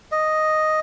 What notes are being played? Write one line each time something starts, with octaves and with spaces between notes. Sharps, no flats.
D#5